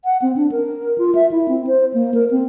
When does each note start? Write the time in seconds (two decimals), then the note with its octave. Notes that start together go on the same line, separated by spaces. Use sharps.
0.05 F#5
0.22 C4
0.36 D4
0.52 A#4
0.98 F4
1.15 E5
1.31 E4
1.48 C4
1.67 C5
1.94 A#3
2.14 A#4
2.31 C4